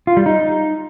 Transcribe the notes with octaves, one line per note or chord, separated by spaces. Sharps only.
F4
G3
D#4